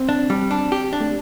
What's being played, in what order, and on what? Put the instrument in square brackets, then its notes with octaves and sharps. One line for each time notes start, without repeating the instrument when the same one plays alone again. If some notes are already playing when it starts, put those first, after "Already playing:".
Already playing: [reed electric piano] C4
[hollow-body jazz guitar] D4
G3
D4
G4
D4
[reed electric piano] A3